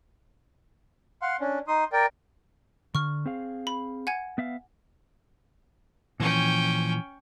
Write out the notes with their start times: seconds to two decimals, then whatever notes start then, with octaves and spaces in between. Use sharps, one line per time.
1.22 F5 F#5 C6
1.40 C#4 D4
1.68 D#4 C6 D#6
1.92 A#4 D5 G5
2.95 D3 C#6 F6
3.26 C4 G#4 F5
3.67 B5
4.07 F#5 G#5 G#6
4.38 B3 E5 F5
6.20 A#2 E3 F3 C#4 G5